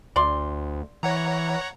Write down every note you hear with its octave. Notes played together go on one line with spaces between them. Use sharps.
D2 D5 C6
E3 C#5 F#5 A#5